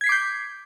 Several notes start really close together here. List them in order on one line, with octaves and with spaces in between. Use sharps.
G#6 B6 C7 D6 G6